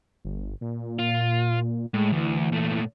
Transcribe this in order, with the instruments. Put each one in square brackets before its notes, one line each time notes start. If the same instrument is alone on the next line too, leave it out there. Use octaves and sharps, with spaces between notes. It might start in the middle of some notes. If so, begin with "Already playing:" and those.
[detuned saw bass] G1
A#2
[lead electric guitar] F4
[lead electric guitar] A2 [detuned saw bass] G#3
[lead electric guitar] D2 [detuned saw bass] E3
[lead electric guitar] A#2 A3